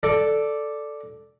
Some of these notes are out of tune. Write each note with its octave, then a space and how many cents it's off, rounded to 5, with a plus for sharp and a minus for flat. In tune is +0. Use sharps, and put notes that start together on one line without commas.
A4 +0 D5 +0